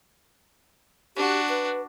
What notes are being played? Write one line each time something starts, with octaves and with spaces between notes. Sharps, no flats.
D4 F#4 G4
B4